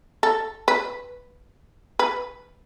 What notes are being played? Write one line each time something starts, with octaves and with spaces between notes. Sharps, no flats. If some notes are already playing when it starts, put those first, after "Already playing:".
A4
B4
B4